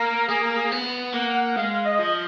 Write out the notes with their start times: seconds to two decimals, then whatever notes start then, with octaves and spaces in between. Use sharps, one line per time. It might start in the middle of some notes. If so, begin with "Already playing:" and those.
Already playing: A#3 A#4
0.28 A#3 G#4
0.43 A#4
0.55 G#4
0.72 B3
1.14 A#3 F#5
1.56 G#3 F5
1.85 D#5
1.99 F3